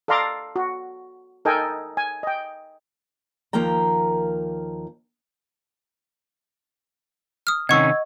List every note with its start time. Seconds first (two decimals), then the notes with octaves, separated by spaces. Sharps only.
0.08 A4 D5 F5 A#5 C6 D6
0.56 F#4
1.45 D#4 A4 A#4 D#5 G5 G#5
1.97 G#5
2.23 D#5 G5
3.53 D#2 F3 A#3 A#4 G5 A#5
7.47 D#6 F6
7.69 C3 D#3 C#4 D#5 F#5 C#6 E6 G#6